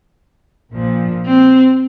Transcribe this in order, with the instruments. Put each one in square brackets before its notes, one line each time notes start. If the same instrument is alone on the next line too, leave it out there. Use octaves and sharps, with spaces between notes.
[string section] A#1 A#2 F3
[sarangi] C4